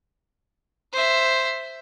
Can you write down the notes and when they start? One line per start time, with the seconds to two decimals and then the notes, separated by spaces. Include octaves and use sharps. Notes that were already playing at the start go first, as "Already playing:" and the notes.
0.93 C5 E5